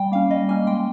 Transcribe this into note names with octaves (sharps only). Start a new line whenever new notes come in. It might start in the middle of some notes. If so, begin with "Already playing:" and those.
Already playing: G3 G5
A#3 C#4 F5
G3 D#5
A#3 C#4 G#5
G#3 G5